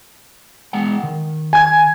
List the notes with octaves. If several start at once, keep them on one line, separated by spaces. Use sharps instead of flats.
G#3 F#5 G5
D#3
G#5 G#6